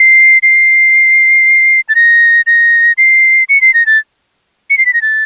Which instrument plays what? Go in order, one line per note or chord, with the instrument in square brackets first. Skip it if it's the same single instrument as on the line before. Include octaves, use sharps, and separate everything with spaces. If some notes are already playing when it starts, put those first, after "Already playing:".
Already playing: [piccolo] C7
C7
A6
A#6
A#6
C7
C#7
C7
A#6
A6
C#7
C7
B6
A#6
A6